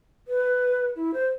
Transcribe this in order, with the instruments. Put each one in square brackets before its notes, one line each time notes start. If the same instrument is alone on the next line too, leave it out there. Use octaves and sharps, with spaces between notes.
[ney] B4
E4
C5